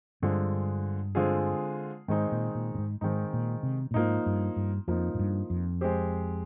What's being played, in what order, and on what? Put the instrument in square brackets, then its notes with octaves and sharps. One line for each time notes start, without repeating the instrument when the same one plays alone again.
[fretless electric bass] G2 [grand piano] D3 G#3 C4 F4 G#4
[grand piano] D3 G#3 C4 F4 G#4
[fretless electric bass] G#2 [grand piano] D#3 G#3 C4 D#4
[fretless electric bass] A#2
A#2
A#2
G#2
[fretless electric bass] G#2 [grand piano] D#3 G#3 C4 D#4
[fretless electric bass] A#2
C3
A#2
[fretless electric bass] G#2 [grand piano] F3 A#3 D#4
[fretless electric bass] G2
G2
[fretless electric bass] F2 [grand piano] F3 A#3 D#4
[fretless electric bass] G#2
G2
F2
[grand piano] G#3 C4 G4 C5